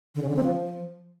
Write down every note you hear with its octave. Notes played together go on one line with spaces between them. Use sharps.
D3
C#3
D3
C4
F3